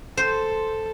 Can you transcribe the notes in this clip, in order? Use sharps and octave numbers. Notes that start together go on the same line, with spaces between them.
A4 C5